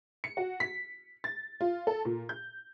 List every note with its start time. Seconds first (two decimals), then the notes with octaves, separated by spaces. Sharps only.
0.24 C#7
0.37 F#4
0.60 B6
1.24 A6
1.61 F4
1.87 A4
2.05 A#2
2.29 G6